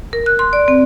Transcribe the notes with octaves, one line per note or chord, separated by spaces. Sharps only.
A#4
F#6
C6
D5
C4